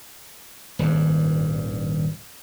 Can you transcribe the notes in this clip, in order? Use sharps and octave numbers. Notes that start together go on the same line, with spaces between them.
D#1 G#1 G2